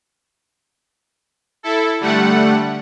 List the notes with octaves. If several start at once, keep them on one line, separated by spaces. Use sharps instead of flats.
E4 A4
D3 G3 A3 F#5